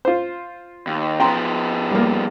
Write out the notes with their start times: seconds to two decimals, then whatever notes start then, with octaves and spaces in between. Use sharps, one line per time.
0.05 F4 C5
0.87 D#2
1.20 F3 B3 G5 A#5 C6
1.91 G3 A#3